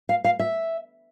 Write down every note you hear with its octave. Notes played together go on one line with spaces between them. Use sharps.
F5
F5
E5